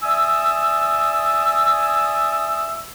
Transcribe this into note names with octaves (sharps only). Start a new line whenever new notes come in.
D5 E5 G#5 D#6 E6